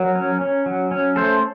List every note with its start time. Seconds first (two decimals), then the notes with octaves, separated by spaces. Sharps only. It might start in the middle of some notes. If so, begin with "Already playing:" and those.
Already playing: F#3 A#4
0.15 C#4
0.41 C#4
0.66 F#3
0.91 C#4
1.16 A3 A4 C5